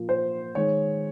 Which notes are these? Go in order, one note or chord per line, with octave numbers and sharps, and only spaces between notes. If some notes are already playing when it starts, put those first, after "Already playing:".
Already playing: A#2 F3 A#3
C5
D#3 G#3 C#5